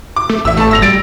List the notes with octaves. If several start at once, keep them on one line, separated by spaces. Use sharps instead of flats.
D6
A3
A1 E5 E6
A3 A5
G1 E6 A#6 F7
G3 A6 D7